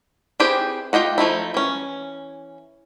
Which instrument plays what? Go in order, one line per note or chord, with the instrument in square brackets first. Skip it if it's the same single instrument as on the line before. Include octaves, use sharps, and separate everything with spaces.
[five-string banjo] C4 E4 G4 G#4 B4
A3 F4 G4 D#5 F#5
F3 A3 D#4 E4
E3 C#4